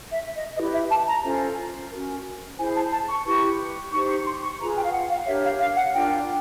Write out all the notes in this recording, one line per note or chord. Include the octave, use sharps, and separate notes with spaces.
E5
D#5
E4 G4 B4 D#5
E5
A5
A#5
C#4 F4 A4 C5
C#4 F#4 A#4
E4 G#4 C5 G#5
A5
A5
C#6
E4 G4 B4 C#6
D#4 G4 C5 C#6
C#6
C6
C#6
F4 G#4 B4 A#5
G5
F5
F#5
F5
D4 G4 A#4 C#5 E5
F5
F5
F#5
D4 F4 A#4 G5